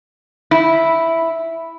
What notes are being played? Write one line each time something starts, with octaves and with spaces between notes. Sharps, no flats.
E4